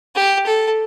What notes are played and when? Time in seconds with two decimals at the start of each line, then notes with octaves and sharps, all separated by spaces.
0.15 G4
0.46 A4